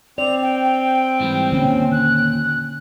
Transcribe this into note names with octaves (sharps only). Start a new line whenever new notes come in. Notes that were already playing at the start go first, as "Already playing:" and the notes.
C4 D5 F7
G5
G#2 E3 G3
D#2 A#2 D3 C#4
F#6